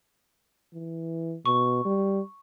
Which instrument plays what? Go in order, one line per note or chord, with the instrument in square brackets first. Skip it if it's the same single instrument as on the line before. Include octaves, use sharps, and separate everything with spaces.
[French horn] E3
[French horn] B2 [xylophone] C#6
[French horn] G3